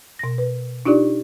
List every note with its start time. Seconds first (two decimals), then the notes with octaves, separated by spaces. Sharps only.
0.19 B2 A#6
0.38 B4
0.85 D4 D#4 F4 G4 D5